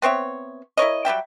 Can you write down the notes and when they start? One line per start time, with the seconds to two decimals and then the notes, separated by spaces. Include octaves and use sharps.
0.02 B3 C4 C#5 E5
0.77 E4 A#4 C#5 D#5
1.05 F#3 G3 E5 G5